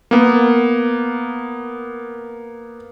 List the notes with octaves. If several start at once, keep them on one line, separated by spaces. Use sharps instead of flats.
A#3 B3